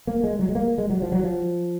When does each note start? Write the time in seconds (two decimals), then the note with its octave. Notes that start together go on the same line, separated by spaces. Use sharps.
0.07 A#3
0.24 G#3
0.39 F#3
0.49 G#3
0.55 A#3
0.78 G#3
0.90 F#3
1.02 F3
1.12 F#3
1.23 F3